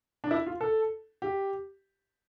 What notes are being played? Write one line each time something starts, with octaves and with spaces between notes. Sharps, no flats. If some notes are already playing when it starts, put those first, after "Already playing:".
D4
E4
F4
A4
G4